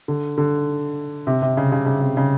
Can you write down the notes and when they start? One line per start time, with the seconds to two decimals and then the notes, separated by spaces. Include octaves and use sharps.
0.08 D3
0.38 D3
1.27 C3
1.42 C3
1.57 C#3
1.72 C#3
1.86 C#3
2.01 C3
2.17 C#3